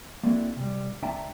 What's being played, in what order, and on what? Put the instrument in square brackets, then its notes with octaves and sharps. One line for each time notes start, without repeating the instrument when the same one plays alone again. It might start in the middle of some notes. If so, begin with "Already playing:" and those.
[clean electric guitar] A#3 C4 D4 E4 F#4 A4
C3 G3
C#2 D4 E5 G5 A5 A#5